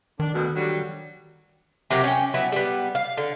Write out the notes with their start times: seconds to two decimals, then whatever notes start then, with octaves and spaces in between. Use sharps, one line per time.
0.20 D#3 D4
0.33 D2 B2
0.55 D3 F#3 G3
1.90 C3 F#3 G4 A#4
2.04 C#4 G5
2.34 F#3 B3 E4
2.52 G3 B3
2.95 F5
3.18 D3